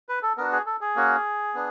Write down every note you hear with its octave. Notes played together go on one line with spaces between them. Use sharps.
B4
A4
B3 D4 F#4 A#4
G#4
A4
G#4
A#3 C#4 F#4
B3 D4